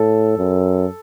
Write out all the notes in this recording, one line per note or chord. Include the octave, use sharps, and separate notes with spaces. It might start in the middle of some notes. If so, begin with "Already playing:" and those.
Already playing: A2 A4
F#2